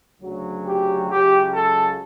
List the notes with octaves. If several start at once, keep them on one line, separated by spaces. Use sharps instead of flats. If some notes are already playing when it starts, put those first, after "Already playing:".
D2 C#3 F#3
G4
C#2 C#3 F#3 G4
A4